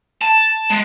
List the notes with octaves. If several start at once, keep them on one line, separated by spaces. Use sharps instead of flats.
A5
G#3